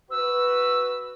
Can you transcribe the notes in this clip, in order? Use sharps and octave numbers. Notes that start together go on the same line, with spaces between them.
F#4 B4 E6